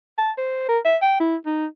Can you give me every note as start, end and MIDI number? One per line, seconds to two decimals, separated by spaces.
0.18 0.31 81
0.38 0.66 72
0.69 0.79 70
0.85 0.97 76
1.02 1.18 79
1.20 1.36 64
1.46 1.66 63